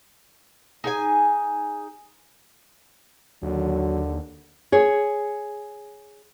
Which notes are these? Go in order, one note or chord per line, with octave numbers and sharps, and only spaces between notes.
D#4 G#4 G#5
D#2 D3 F#3
G#4 C#5